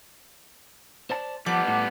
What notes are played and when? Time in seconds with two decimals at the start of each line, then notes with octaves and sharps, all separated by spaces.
1.10 C5 D5 A5
1.46 F3 G3 B3 F#5 A5 D6
1.67 A2